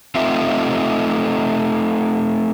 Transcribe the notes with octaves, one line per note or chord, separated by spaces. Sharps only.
A3 C4 D#4 F4 E5